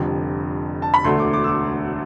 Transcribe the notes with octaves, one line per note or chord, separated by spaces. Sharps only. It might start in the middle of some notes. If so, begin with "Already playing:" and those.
Already playing: F1 F2 D3 G3
A5
B5
E1 D2 D3 A3 C6
D6
D6
E6
D6